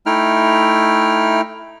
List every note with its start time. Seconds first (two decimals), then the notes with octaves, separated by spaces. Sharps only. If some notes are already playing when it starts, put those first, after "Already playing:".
0.06 A3 D#4 E4 G5 F6